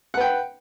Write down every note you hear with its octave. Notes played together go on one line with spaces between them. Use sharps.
B4 F#5 G5